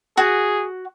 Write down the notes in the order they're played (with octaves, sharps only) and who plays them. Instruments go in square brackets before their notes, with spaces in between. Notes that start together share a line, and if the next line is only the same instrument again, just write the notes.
[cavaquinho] F#4 [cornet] G#4